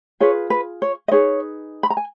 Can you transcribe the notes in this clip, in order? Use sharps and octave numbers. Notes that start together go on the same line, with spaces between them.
F4 G#4 B4 C#5
B4
C#5
D#5
D#4 G#4 B4 C#5
B5
A#5
G#5